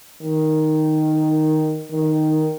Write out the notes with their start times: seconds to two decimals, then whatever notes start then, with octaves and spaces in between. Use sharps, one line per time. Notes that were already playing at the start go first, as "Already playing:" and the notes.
0.21 D#3
1.91 D#3